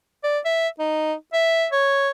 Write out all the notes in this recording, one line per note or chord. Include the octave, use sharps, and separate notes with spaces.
D5
E5
D#4
E5
C#5